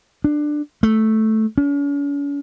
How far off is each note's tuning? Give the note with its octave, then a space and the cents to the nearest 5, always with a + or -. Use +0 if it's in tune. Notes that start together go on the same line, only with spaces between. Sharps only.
D4 +15
A3 -5
C#4 +45